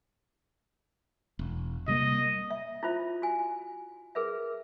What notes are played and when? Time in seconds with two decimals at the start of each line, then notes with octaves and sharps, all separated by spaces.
1.39 E1
1.88 C3 G3 A#3 D#5
2.50 E5
2.83 E4 F4 C5 E5
3.22 F#4 G#5
4.15 G#4 A#4 B4 E5